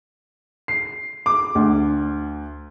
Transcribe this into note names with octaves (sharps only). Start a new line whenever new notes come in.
C7
D6
D2